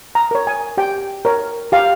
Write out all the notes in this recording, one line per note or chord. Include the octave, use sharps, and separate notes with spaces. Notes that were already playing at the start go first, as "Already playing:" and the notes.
A#5
A#4 C#5
G#5
G4 G5
A#4 C#5
G4 F5